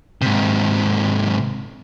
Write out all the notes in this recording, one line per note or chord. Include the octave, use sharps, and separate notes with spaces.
G#2 C3